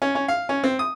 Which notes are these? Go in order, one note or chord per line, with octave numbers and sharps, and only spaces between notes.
C#4
C#4
F5
C#4
C4
D#6